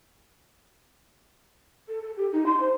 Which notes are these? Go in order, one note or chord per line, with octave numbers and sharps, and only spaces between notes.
A4
A4
G4
D#4
C6
C5